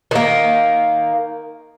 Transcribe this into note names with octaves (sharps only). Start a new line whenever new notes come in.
D#3 A#3